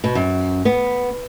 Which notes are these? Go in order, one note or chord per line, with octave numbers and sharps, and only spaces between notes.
B2
F#2
B3